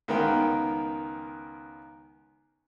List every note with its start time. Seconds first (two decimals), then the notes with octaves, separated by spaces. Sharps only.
0.08 C#2 D#3 B3 A#4 G5